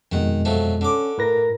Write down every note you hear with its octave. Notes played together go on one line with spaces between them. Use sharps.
F2 B2 D#3 G#3 F#5
F3 F#3 A3
D3 C#4 D6
A2 A#4 B4 A#6